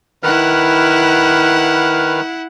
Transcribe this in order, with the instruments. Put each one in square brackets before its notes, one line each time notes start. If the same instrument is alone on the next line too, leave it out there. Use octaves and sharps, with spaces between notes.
[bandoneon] D#3 B4 F6 [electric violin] E4 F#5